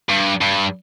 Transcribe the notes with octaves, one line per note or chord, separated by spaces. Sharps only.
G2
G2